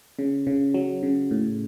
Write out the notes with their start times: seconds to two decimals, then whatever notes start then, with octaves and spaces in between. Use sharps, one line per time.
0.19 C#3
0.47 C#3
0.74 F#3
1.03 C#3
1.31 A2